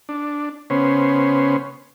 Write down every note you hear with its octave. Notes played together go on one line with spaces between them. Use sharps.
D4
C#3 B3 C#4 C5